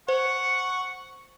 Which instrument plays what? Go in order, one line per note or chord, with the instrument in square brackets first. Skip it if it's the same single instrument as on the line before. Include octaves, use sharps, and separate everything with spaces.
[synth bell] C5 [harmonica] F#5 C#6